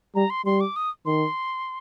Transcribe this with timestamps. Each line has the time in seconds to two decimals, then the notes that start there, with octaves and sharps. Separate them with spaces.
0.15 G3 A#5
0.30 C6
0.46 G3 C6
0.60 D6
0.76 D#6
1.06 D#3 C6